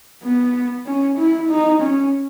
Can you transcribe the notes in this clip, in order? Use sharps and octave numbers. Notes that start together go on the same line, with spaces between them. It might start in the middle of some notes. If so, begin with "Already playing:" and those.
B3
C#4
E4
D#4
C#4